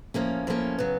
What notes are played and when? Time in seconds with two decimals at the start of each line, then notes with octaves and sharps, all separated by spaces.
0.14 A2 F3 A#3 C#4
0.47 A2 F3 A#3 C#4
0.79 C#3 F#3 B3